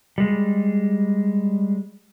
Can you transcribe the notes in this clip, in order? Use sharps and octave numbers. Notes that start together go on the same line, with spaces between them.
G3 G#3